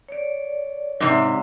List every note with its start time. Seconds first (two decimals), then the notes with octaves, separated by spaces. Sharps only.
0.09 C#5 D5
1.00 G#2 C3